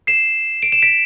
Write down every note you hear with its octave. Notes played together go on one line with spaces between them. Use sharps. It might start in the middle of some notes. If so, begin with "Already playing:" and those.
C7 E7
D7
E7
B6 D7